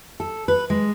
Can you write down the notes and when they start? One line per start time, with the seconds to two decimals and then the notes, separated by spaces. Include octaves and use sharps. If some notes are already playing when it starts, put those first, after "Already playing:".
0.20 A4
0.48 B4
0.70 G#3